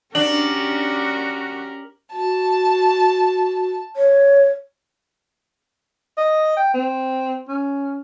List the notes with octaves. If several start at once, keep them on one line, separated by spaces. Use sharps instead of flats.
C#4 D4 F#4 G4 A#4 F#7
F#4 A5
C#5
D#5
G5
C4
C#4